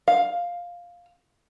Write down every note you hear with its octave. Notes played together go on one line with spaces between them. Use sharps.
F5